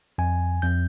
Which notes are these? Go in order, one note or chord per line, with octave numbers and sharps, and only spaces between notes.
F2 G#5
F2 G6